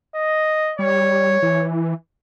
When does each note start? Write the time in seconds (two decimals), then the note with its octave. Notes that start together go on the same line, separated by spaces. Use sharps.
0.15 D#5
0.79 G3 C#5
1.42 E3